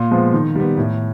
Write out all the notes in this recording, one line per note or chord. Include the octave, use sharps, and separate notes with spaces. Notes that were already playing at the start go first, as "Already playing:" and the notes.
Already playing: A#2
F3 G#3 B3
D#3
G3 B3
A2